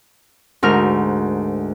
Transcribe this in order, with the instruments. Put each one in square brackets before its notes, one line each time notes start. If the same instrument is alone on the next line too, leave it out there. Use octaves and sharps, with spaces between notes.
[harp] D2 G#2 A#4 F6